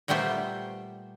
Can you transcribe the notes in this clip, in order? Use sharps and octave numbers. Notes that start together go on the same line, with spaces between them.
A#2 G3 A3 B3 G4 C5